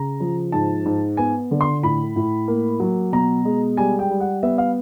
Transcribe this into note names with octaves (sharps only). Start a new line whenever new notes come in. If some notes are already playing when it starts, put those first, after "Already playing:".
Already playing: C#3 A#5
F3
G#2 A5
G#2
B3 G#5
D3
C6
A2 B5
A2
A#3
F#3
B2 A#5
G#3
G3 G#5
G5
G3
F#5
B3 E5
F5